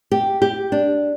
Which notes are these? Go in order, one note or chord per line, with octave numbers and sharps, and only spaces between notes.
G4
G4
D4